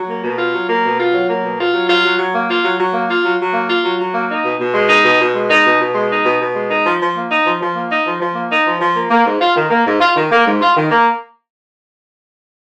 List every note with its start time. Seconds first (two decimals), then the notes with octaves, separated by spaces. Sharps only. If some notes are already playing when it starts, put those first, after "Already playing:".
Already playing: F#3
0.08 A#3
0.23 B2
0.38 F4
0.53 F#3
0.68 A#3
0.83 B2
0.99 F4
1.14 F#3
1.28 A#3
1.43 B2
1.58 F4
1.73 F#3
1.89 F4
2.04 F#3
2.18 F#3
2.34 A#3
2.48 F4
2.64 F#3
2.78 F#3
2.93 A#3
3.09 F4
3.24 F#3
3.39 F#3
3.54 A#3
3.69 F4
3.84 F#3
3.99 F#3
4.14 A#3
4.29 D#4
4.44 B2
4.59 B2
4.74 G#3
4.89 D#4
5.04 B2
5.19 B2
5.35 G#3
5.50 D#4
5.65 B2
5.80 B2
5.95 G#3
6.10 D#4
6.24 B2
6.40 B2
6.55 G#3
6.70 D#4
6.85 F3
7.00 F3
7.15 A#3
7.30 D#4
7.45 F3
7.60 F3
7.76 A#3
7.90 D#4
8.04 F3
8.21 F3
8.35 A#3
8.51 D#4
8.65 F3
8.80 F3
8.95 A#3
9.10 A#3
9.26 G#2
9.41 F4
9.56 D#3
9.70 A#3
9.86 G#2
10.00 F4
10.16 D#3
10.31 A#3
10.46 G#2
10.61 F4
10.76 D#3
10.91 A#3